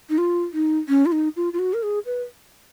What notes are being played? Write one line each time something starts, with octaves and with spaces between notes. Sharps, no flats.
D#4
F4
D#4
C#4
F4
D#4
F4
F4
F#4
A#4
G#4
B4